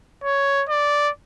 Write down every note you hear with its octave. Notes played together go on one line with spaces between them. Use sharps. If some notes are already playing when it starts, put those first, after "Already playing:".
C#5
D5